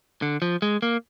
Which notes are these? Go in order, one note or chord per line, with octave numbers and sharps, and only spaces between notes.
D3
F3
G#3
A#3